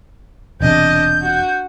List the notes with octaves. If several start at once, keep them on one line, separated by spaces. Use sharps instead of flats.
E1 E2 C3 D4 D#5 G6
F#4